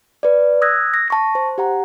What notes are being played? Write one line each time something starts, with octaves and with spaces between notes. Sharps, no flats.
B4 D5
D#6 E6 F#6 G#6 A#6
A#6
A5 C#6 A#6
C5
G4 F#5 A#5